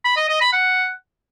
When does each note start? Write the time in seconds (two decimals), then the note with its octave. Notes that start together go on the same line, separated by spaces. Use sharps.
0.05 B5
0.17 D#5
0.29 D#5
0.41 B5
0.53 F#5